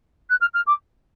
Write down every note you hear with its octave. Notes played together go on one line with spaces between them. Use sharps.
F#6
F6
F6
D6